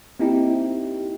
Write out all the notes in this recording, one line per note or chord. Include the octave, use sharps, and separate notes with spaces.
A#3 C4 D#4 E4 G4